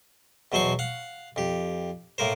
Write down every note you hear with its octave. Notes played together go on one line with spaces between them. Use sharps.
E2 B2 F#3 C5 C6 C#6
F5 F#5
F2 G4
A2 A#3 A#4 C5